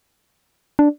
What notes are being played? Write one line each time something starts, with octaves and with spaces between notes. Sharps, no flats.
D4